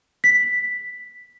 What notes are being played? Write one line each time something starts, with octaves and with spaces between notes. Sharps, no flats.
B6